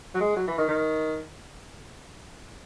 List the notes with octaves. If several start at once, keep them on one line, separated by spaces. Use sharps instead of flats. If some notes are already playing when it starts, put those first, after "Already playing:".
F#3
G#3
F#3
E3
D#3
D#3